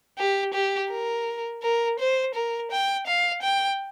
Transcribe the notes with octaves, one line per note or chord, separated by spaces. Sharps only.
G4
G4
A#4
A#4
C5
A#4
G5
F5
G5